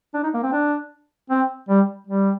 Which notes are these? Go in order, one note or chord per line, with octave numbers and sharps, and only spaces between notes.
D4
D#4
A#3
C4
D4
C4
G3
G3